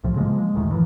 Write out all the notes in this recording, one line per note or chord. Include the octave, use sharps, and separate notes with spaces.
C2 A2 F3
C#3 F3 G#3 A#3
G#3
D1 F#2 A2 D#3
E3 F3